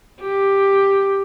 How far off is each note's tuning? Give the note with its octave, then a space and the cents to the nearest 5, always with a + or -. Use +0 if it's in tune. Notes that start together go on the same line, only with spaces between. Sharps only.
G4 +5